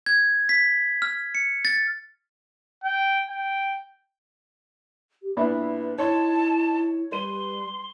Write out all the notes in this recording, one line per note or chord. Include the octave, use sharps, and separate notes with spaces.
G#6
B6
F6
C#7
A6
G5
G5
G4
A#2 B3 D4 E4 B4 E5 B5
D#4 E4 C#5 A5 C6 G#6
G3 B4 C6 D#7